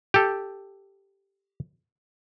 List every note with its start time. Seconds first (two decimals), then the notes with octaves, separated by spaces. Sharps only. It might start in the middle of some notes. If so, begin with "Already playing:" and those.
0.14 G4 A4